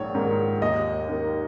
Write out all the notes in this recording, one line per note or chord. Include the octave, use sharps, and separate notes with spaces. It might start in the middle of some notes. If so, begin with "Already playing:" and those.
Already playing: A#1 G#2 D#3 C#5
G#2 D#3 A#3
D#2 D#5
D#3 A#3